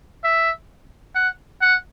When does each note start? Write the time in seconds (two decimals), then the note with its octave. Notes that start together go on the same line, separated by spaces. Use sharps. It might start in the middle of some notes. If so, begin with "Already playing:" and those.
0.24 E5
1.15 F#5
1.61 F#5